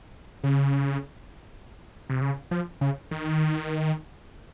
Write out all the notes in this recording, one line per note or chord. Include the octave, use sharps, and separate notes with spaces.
C#3
C3
C#3
F3
C#3
D#3